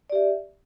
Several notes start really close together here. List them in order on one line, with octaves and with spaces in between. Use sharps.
D5 G4 E5